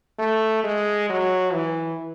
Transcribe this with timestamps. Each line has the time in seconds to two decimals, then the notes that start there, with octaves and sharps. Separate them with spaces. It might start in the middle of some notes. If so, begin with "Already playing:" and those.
0.19 A3
0.64 G#3
1.09 F#3
1.53 E3